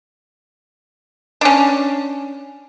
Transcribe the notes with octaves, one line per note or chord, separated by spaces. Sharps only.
C#4 D4